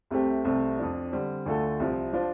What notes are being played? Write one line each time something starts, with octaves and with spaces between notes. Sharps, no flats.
C2 C3 A3 C4 G4
C2 C3 A3 C4
F2 F3 D4
D3 G3 C4
D2 D3 A3 F4 A4
C2 C3 F3
F3 D4 F4 C5